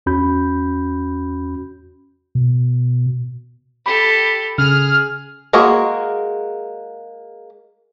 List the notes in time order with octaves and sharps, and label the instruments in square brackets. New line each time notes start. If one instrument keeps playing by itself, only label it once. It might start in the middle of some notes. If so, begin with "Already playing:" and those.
[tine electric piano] E2 C#4 F#4 B5 G6
[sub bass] B2
[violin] G4 A4 [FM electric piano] B5
[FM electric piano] C#3 [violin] G#4 [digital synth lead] F6
[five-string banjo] G#3 A#3 F#4 G#4 A#4